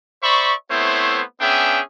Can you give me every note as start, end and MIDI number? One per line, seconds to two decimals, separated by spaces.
0.23 0.53 72
0.23 0.53 74
0.23 0.53 76
0.23 0.53 83
0.23 0.53 85
0.70 1.22 57
0.70 1.22 59
0.70 1.22 60
0.70 1.22 64
0.70 1.22 72
0.70 1.22 73
1.41 1.80 59
1.41 1.80 61
1.41 1.80 62
1.41 1.80 68
1.41 1.80 76
1.41 1.80 79